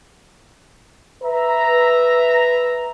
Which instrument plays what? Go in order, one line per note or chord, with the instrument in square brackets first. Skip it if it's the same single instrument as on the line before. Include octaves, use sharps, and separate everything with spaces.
[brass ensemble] B4 E5 A#5